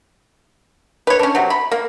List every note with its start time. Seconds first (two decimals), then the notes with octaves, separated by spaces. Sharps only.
1.07 B4 C#5
1.19 C#4 D4
1.35 C3 F#3
1.50 B5
1.71 A#3